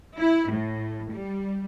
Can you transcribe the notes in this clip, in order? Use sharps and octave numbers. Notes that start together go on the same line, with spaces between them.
E4
A2
G3